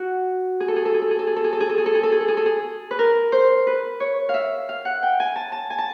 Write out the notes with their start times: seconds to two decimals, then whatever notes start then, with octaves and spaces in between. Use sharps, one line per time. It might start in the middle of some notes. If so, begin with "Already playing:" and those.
Already playing: F#4
0.60 G#4
0.68 A4
0.76 G#4
0.85 A4
0.94 G#4
1.02 A4
1.11 G#4
1.19 A4
1.27 G#4
1.36 A4
1.44 G#4
1.53 A4
1.60 G#4
1.69 A4
1.78 G#4
1.86 A4
1.95 G#4
2.03 A4
2.12 G#4
2.21 A4
2.28 G#4
2.37 A4
2.46 G#4
2.91 B4
2.99 A#4
3.32 C5
3.67 B4
4.00 C#5
4.29 F5
4.34 E5
4.69 F5
4.85 F#5
5.03 G5
5.20 G#5
5.36 A5
5.52 A5
5.70 G#5
5.78 A5